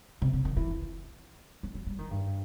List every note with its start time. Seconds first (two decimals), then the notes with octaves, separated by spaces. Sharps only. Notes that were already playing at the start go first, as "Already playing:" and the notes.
0.22 C3
0.33 C3
0.45 D#3
0.57 E3
1.63 F#3
1.75 F#3
1.87 G3
1.99 D#3
2.11 G2